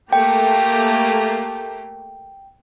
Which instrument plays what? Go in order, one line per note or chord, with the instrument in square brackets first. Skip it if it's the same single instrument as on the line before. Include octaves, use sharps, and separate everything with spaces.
[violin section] A3 A#3 G4 [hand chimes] G5